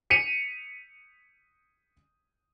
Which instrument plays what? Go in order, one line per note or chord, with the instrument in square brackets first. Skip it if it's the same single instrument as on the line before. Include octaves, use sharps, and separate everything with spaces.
[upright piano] B6 C#7 D#7 F7